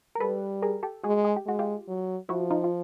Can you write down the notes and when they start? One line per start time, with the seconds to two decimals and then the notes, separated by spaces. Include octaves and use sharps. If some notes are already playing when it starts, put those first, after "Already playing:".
0.15 A#4
0.20 G3 A4 B4
0.62 G#4 A#4
0.83 G4 A4
1.03 G#3 F#4 G#4
1.25 G#4
1.36 G4
1.46 G#3 F#4
1.59 F4 G4
1.88 F#3
2.29 F3 E4 F#4
2.50 D#4 F4
2.64 F4